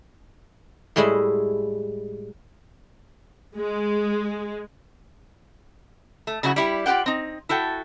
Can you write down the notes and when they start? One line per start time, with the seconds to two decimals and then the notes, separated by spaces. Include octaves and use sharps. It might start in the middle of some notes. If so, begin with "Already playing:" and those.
0.96 A2 G3 G#3 E4 G#4 E5
3.55 G#3
6.27 A3
6.43 C#3 F#3 E4 F#4
6.56 G3 E4 G4
6.86 F4 G4 G#4 F#5 G5
7.06 C4 D#4
7.49 E4 F#4 A4 G5